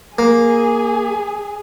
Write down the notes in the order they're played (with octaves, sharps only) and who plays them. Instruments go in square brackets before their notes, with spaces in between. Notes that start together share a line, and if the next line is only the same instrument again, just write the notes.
[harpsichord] A#3 [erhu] G#4